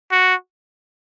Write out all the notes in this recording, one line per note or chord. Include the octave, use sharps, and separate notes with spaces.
F#4